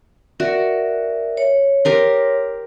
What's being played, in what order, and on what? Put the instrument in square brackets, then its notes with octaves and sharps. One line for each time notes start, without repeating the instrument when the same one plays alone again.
[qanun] F#4 [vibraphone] A#4 D5 E5
[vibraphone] C#5
[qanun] G4 A#4 C6